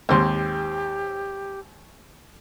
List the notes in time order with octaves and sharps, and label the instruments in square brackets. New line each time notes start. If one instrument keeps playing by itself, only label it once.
[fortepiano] D#2 G#2 [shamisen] C4 C5 [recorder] G4